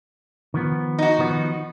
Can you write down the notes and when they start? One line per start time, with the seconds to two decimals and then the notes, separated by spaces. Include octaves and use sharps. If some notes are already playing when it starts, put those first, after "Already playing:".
0.54 D#3 F3 B3
0.99 D#4 F#4
1.19 D#3 F3 B3